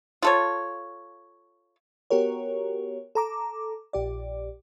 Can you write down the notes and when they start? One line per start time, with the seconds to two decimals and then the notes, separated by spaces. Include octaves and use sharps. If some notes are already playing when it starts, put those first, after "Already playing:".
0.22 F4 A4 C#5
2.10 B3 F#4 G4 A#4 C#5
3.15 A4 A#5 D6
3.93 A#1 G4 D5